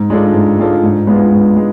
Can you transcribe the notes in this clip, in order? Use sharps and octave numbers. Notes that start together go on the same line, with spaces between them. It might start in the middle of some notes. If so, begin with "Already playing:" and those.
Already playing: G#2
G#3 D4 F4 A4
G#2
G#3 D4 F4 A4
G#2
G#3 B3 D4 F4
G#2
G#3